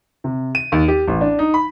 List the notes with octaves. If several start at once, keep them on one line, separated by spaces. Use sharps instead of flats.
C3
D#7
D#2
G4
A1
D4
D#4
B5